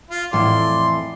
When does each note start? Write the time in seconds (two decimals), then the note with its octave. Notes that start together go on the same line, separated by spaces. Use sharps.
0.10 F4
0.33 F2 A2 E3 D5 C6